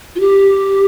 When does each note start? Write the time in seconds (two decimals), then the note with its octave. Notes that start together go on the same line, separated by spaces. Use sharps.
0.15 F4
0.20 G4